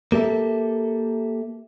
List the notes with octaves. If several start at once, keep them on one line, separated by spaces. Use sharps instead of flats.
A#3 G4 A4 E5